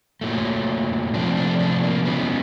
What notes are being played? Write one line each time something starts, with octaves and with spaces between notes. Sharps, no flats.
A#2 F#3 A3
C3 F3 A3 D4
D4
D4
A#3
C#3 E3 G#3 B3